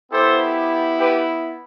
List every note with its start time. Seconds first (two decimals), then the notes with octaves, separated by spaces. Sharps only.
0.11 B3 E4 G4 A4 C5
0.99 G4 B4